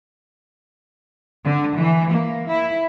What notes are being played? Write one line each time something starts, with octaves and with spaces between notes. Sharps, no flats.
D3
E3
A#3
E4